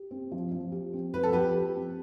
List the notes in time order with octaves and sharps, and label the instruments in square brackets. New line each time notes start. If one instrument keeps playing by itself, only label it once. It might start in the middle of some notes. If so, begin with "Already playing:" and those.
Already playing: [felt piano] G4
C4
F3
F3
G4
C4
[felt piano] F3 [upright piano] B4
[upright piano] A4
[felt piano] F3 [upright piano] G4 B4
[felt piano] G4
C4